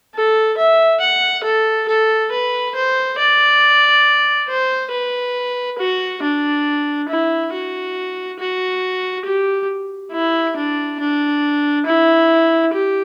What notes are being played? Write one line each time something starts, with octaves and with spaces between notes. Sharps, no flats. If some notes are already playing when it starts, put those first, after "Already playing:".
A4
E5
F#5
A4
A4
B4
C5
D5
C5
B4
F#4
D4
E4
F#4
F#4
G4
E4
D4
D4
E4
G4